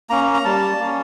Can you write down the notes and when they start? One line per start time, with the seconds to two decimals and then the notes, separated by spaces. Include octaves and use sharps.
0.10 A#3 C#4 A#5
0.34 A#5
0.45 G3 A5
0.80 A#3 C#4